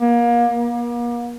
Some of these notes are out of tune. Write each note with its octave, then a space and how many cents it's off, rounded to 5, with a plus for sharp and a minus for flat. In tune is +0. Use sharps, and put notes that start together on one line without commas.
A#3 +30
A#3 +40